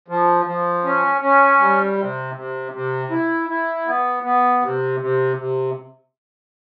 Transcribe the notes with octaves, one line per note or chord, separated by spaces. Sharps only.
F3
F3
C#4
C#4
G3
C3
C3
C3
E4
E4
B3
B3
C3
C3
C3